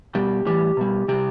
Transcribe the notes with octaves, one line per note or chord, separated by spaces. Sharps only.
B2 G3 G4
A2 E3 G3 G4
B2 G3
C3 G3 G4